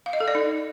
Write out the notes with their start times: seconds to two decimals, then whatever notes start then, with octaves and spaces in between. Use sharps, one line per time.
0.06 F5
0.13 D#5
0.20 A4
0.28 D5
0.35 D#4